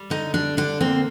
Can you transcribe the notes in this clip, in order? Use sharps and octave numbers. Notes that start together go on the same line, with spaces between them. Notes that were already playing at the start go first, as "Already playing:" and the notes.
Already playing: G3
D3 D#4
G3 D4
D3 D4
A#3 C4